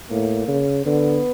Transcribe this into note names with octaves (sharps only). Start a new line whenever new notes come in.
A2 A#3
C#3
D3 B3